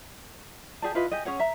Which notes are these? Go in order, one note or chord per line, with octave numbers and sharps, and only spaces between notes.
G4 G#4 D5 A5
E4 F4 B4 D#5
G4 G#4 D#5
C#4 G#4 C#5 F#5
E5 A#5